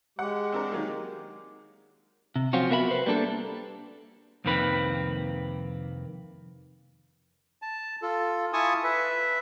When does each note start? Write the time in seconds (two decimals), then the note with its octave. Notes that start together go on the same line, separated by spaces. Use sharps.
0.19 G#3 G4 F#5
0.52 C4 D4 A#4
0.72 D#3 F#3 A#3
2.36 C3
2.53 F3 F#3 C4 C#4 F4 F#4
2.70 B3 F#4 A#4 E5 A#5 B5
2.91 B4 C5
3.06 G3 A#3 D4 A4
4.45 C2 F2 D#3 A#3 C4 B4
7.62 A5
8.02 F4 A4
8.53 E4 F4 G#5 A5 C#6 D#6
8.84 B4 E5